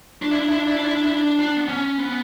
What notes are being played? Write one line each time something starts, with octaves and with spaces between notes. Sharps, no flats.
D4
E4
D4
E4
D4
E4
D4
E4
D4
E4
D4
D4
B3
C#4
B3